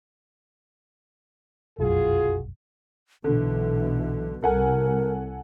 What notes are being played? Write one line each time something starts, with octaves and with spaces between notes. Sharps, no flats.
F1 B1 F#2 F4 F#4 G#4
B1 B2 D3 E3
C2 A4 A#4 F#5 G#5